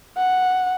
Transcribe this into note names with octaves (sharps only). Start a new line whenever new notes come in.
F#5